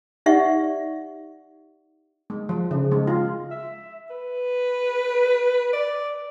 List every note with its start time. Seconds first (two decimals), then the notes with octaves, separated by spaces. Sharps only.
0.26 D#4 G4 D5 E5 F#5 C#6
2.30 G#3
2.49 F3
2.71 C#3
2.92 G#3
3.07 F4
3.51 E5
4.10 B4
5.73 D5